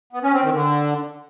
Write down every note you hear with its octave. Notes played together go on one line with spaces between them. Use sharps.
B3
C#4
C4
D#3
D3